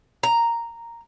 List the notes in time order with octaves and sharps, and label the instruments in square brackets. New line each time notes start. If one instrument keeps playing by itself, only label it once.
[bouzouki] A#5